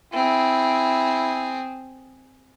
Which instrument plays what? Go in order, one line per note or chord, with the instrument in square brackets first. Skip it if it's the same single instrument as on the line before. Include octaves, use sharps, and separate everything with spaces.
[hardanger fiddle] C4 G#4 [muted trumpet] E4